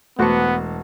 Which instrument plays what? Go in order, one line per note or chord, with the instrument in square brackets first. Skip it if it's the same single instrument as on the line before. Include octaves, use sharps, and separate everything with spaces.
[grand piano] E1 A5 [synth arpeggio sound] A3 D6 C#7 [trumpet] B3 [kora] F#4 C5